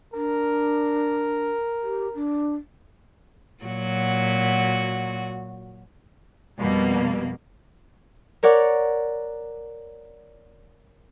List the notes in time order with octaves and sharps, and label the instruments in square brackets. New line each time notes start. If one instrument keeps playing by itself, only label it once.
[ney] D4 [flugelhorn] A#4
[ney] G4
D4
[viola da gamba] A#2 F#3 F#4
[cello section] F2 B2 G3 A#3
[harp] A#4 C#5 D5 F#5